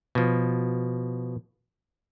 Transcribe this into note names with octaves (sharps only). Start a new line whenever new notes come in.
B2 F3